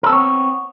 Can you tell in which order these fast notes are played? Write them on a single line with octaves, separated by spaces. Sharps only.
A#4 A4 C4 C#5 B3